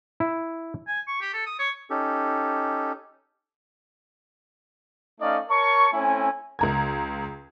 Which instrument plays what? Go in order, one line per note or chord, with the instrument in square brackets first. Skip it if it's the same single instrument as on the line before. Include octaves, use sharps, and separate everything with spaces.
[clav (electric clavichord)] E4
[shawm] G#5
C#6
G4
A4
D#6
C#5
[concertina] C#4 D#4 G4 A4
[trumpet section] A3 C#4 D#4 D5 D#5 F5
A#4 C#5 A5 C#6
A3 C4 C#4 E4 G#5
[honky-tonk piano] C#2 A#5 G#6